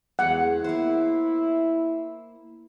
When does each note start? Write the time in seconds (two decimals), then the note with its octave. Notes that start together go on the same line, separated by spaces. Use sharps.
0.19 E2 G#3 F#5
0.64 A#3 E4 C5